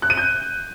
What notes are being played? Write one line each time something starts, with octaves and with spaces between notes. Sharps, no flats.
F#6
D#7
G6